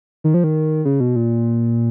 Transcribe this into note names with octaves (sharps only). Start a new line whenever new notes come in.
D#3
F3
D#3
C#3
B2
A#2